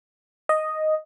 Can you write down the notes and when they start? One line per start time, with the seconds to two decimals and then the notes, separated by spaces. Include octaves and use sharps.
0.49 D#5